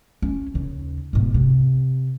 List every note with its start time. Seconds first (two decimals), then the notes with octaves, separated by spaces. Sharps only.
0.22 C#4
0.54 D#2 C#3
1.13 G#2 B2
1.34 C3